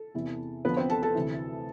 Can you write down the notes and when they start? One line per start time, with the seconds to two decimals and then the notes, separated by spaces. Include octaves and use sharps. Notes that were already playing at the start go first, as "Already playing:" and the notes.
Already playing: A4
0.14 E2 C3 E3
0.65 E2 D3 F3 B3 B4
0.77 C4 C5
0.90 A4 A5
1.03 A4 A5
1.15 D2 C3 E3